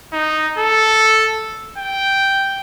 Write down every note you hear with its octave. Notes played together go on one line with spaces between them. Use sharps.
D#4
A4
G5